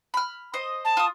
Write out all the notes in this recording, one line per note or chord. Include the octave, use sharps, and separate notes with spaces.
B5 F6
C5 D#5
A5
F4 D#6